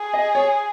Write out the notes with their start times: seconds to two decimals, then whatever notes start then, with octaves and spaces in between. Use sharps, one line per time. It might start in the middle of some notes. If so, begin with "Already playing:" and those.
Already playing: G#4
0.14 D#5
0.35 C#5